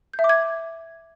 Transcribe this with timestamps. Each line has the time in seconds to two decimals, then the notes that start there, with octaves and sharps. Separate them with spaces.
0.14 G6
0.19 E5
0.24 D6
0.29 G#6